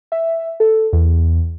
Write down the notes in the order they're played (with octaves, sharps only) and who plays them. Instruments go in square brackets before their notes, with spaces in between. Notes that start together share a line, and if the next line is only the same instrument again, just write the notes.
[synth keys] E5
A4
E2